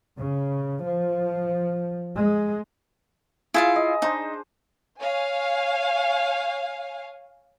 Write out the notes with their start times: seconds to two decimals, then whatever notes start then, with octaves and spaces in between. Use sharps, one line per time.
0.18 C#3
0.84 F3
2.16 G#3
3.54 E4 F4 G#4 F5
3.76 D#5
4.02 D4 D#4 C5
5.00 C#5 F5 G#5